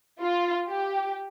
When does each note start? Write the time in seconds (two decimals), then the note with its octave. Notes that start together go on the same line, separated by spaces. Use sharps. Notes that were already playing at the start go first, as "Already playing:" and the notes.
0.21 F4
0.68 G4